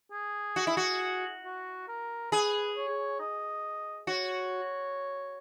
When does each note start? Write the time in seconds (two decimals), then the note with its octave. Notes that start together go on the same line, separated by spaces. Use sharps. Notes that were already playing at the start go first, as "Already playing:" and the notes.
0.12 G#4
0.56 F#4
0.67 E4
0.77 F#4
1.44 F#4
1.88 A#4
2.32 G#4 B4
2.76 C#5
3.20 D#5
4.07 F#4 C#5